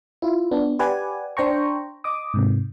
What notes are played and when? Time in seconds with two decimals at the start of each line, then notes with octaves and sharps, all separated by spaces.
0.22 E4 F4
0.51 B3 D4
0.79 G4 B4 D5 F#5 G#5
1.37 D4 C5 G5 A#5 C#6
2.04 D#5 D6 D#6
2.34 G#2 C3